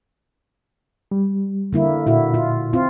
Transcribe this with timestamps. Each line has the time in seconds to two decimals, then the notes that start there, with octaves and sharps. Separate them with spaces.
1.11 G3
1.73 D3 A#3 E4
2.07 A#2 E4 F#4
2.34 F4
2.73 C4 F4